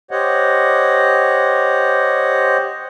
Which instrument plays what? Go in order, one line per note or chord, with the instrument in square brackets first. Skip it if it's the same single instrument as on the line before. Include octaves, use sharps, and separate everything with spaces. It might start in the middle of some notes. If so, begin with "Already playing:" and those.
[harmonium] G4 C5 C#5 D#5 F#5